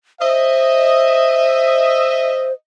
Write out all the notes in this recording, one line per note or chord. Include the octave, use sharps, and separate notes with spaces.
C5 D#5 E5